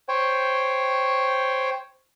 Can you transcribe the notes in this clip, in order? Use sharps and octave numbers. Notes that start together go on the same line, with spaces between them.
C5 C#5 G5